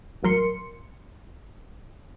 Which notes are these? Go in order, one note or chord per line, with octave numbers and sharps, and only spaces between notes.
A1 F#3 A#4 C6 C#7